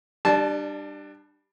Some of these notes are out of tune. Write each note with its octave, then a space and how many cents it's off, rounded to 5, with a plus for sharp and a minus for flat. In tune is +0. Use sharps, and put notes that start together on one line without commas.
G3 +0 D4 +25 A5 -20